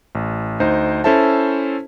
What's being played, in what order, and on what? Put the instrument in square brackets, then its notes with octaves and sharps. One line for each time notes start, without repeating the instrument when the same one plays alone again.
[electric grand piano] A1
D2 D#4 C5
C#4 E4 A4 C5 E5 A5